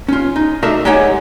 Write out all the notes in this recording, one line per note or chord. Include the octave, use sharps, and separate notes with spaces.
C#4 F4
D#4
A3 D4 F#4 A#4 D#5 E5
G#3 D#4 G4 C#5 F#5 G#5